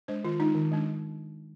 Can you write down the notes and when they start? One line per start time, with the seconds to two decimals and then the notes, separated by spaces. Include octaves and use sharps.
0.08 G#3 D4 C5
0.24 D#3 F4
0.39 G#3 D4 D#4
0.55 D#3
0.71 G#3 D4